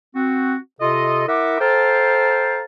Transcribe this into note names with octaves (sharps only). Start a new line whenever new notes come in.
C4 F#4
C3 F4 A4 D#5
E4 A#4 E5 F#5 D6
A4 C5 F5 G5 A5 A#5